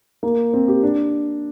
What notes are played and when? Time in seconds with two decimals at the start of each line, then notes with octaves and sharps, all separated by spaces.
0.23 A#3
0.53 C4
0.68 G4
0.83 D4